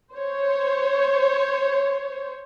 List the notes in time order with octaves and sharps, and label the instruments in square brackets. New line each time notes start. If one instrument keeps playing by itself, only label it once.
[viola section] C5 C#5